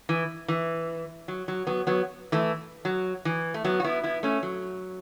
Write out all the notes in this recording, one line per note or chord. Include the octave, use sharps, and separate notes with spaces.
E3
E3
F#3
F#3
F#3 B3
F#3 B3
E3 A3
F#3
E3
A3
F#3 B3
F#4
B3 E4
B3 E4
A3 C#4
F#3